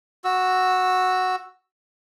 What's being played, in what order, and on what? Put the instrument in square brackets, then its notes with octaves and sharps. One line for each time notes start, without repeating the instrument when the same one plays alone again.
[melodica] F#4 E6